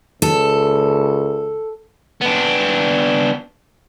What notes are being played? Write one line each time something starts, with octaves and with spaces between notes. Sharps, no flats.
C#2 A4
B3 D4